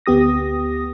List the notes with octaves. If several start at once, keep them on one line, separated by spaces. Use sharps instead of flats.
D2 B3 G4 D#6 A#6